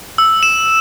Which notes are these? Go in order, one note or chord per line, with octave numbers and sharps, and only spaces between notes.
E6
E7